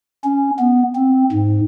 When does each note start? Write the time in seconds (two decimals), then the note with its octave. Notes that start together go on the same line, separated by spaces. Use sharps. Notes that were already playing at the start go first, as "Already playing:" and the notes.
0.24 C#4
0.59 B3
0.96 C4
1.32 G#2